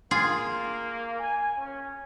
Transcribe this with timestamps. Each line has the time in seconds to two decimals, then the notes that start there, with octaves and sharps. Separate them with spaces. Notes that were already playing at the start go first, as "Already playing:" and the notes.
0.11 A#3 F4 G#4
1.18 G#5
1.57 C#4